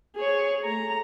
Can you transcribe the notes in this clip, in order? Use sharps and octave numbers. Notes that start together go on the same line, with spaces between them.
G#4 C#5
A3 A#5